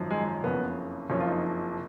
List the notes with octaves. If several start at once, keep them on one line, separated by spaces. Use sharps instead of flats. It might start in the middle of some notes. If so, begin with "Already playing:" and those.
Already playing: G#1 F#2 F3
G#3
F#1 F2 C#3 B3
F#1 F2 F3 C#4
F4
D#4